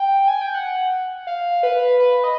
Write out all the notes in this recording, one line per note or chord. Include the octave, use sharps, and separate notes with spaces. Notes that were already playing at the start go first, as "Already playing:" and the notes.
Already playing: G5
G#5
G5
F#5
F5
B4
B4
D#5